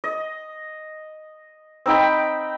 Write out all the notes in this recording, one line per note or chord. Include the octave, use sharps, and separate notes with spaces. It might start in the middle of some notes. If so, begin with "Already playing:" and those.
D#5
C4 D#4 G5 B5